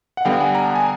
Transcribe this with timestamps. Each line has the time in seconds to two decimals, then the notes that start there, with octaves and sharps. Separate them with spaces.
0.17 F#5
0.25 D3 G3 B3 F5 G5
0.40 F#5 G#5
0.55 A#5
0.65 A5
0.76 G#5